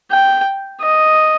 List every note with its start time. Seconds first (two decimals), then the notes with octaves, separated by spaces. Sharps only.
0.11 G5
0.81 D#5